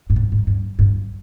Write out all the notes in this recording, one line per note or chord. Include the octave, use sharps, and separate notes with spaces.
G2
G#2
G#2
G2
G2